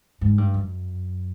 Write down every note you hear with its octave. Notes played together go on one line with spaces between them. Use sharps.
G#2
G2
F#2